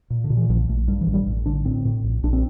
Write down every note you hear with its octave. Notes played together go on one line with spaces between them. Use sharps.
A#2
D3
A#2
E3
A#1 F3
A#1 A3
G2 G3
E3
A1
G3
A1
D3 D4
A2 C4
A2
A#1
A#1 D4
C4